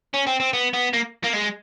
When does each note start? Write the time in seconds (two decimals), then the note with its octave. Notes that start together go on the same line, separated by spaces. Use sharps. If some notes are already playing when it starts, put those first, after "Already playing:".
0.14 C#4
0.27 C4
0.40 C4
0.53 B3
0.73 B3
0.93 A#3
1.24 A#3
1.33 G#3